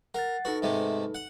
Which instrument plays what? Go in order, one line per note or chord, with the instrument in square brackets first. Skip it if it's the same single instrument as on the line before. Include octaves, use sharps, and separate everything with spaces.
[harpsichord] A#4 [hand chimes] F#5 A6
[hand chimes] D#4 A4 B4 [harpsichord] F#4
[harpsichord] G#2 C3 A3
F#5